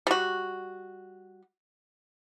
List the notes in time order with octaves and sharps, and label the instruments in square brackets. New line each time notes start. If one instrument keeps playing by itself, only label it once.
[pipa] G3 F#4